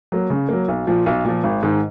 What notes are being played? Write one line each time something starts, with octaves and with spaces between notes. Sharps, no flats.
F#3 A#3
C#3
F#3 A#3
B1
A#2 F3
B1
A#2 F3
G#1
G#2 D#3